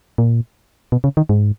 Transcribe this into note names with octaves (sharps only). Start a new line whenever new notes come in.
A#2
B2
C#3
D#3
G#2